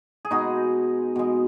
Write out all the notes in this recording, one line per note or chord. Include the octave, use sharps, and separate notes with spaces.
G#4
B2 G#3 D#4 F#4
B2 G#3